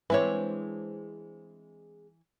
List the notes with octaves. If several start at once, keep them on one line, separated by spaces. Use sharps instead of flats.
E3 G#3 C4 D4 E4 B4 C#5